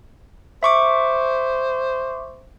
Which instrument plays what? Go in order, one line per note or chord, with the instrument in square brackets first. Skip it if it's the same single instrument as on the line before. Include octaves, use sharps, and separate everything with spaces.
[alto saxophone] C5 [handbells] E5 C#6 D6